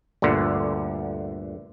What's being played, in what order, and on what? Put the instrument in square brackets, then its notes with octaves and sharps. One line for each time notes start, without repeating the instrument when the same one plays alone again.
[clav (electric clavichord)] G1 D2 A#2 D3